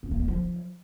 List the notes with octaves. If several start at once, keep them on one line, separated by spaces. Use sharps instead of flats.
C#4
A#3
G#3
F3